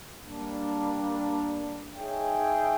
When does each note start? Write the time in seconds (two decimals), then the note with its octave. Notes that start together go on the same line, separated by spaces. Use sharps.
0.23 G3 A#3 D4
1.94 D#4 G#4 C#5 E5 G5